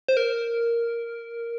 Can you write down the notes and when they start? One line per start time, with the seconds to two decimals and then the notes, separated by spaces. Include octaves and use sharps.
0.08 C5
0.17 A#4